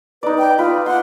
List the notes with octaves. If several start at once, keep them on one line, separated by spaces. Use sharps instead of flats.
D#4 B4 D5
G5
F4 B4
F#5 C6